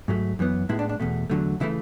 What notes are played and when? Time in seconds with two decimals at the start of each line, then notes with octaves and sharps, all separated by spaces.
0.08 G#2 F#3 A3
0.39 F#2 E3 B3
0.69 A2 G#3 B3 E4
0.79 D4
0.89 D4
1.00 E2 B2 A3
1.30 E2 D3 F#3 A3
1.60 C#3 E3 A3 E4